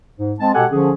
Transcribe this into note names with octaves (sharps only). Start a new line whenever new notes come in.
G#2
G#3 C4 A5
B2 G#3 G4 A4 F#5 G#5
D3 F3 C#4 G#4